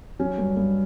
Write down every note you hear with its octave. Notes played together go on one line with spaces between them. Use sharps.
F#3 C#4
G2
G2